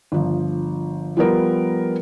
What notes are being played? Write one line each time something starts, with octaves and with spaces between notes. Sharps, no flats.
G1 F3
F3 G3 B3 A#4